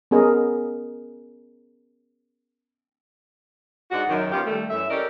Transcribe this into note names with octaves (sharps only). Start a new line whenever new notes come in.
B3 C#4 G#4 A#4 D#5
G#2 D4 D#4 F#4
F#2 D#3
D#3 B3 C#4 F4 G4
D#2 G3 A3
F#2 E3 A3 E5
C#4 G4 A4 A#4 D5 D#5